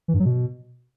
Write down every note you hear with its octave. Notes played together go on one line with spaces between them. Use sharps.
E3
G2
F#3
B2